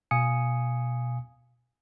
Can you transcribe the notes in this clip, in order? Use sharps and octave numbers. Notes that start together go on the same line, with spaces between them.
B2 F5 G#5 D#6 C#7